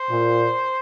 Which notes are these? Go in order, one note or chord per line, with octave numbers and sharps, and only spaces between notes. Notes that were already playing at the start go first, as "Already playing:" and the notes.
Already playing: C5
A#2